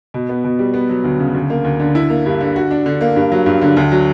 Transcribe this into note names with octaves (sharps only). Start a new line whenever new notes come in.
B2
B3
B2
G3
B3
F#3
D2
C#3
D2
A#3
D2
D3
E4
A#3
G2
D3
F#4
D4
D3
A#3
G2
F#3
G2
D3
D2
F#3